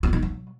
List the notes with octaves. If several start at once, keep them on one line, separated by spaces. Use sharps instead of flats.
F4
D#4
F#3